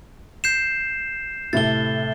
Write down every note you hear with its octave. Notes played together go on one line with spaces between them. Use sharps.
G6 C7 E7
A2 C3 A3 A6 G7